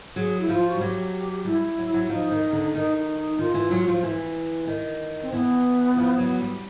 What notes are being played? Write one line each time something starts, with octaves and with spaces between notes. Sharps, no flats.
F#3 G#4
E4
F3 F4
F#4
G3
F#3 G4
G3 E4
F#3
F#3
F3 D#4
D#3
D3
D#3 D#4
D#4
D#4
D#3 F4
E3
F#3
F3
E3
D#3
C4
E3 B3
F3
F#3
G3